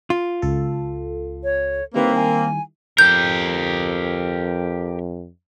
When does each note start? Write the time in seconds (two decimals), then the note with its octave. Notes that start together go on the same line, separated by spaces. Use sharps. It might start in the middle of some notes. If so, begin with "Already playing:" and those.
0.10 F4
0.42 C#2 A4
1.44 C#5
1.94 D#3 G3 A#3 C4 E4 B4
2.15 G#5
2.98 F2 G4 A#4 G6